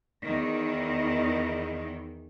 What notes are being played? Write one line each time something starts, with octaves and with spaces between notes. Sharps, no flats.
E2 D#3